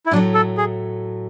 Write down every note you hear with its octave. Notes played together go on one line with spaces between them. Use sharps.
E4
A2 F#3 A3 D4
A4
G#4